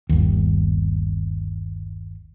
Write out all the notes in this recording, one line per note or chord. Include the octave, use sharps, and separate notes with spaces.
G1 D#2